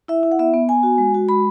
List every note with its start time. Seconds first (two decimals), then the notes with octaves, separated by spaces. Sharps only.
0.08 E4 E5
0.23 E4
0.32 F#5
0.39 B3 E5
0.54 B3
0.69 B3 G#5
0.83 F#4
0.98 G#3
1.14 F#4
1.29 G#3 B5